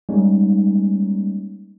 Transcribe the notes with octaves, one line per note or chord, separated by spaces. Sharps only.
G3 G#3 A#3 C#4 D#4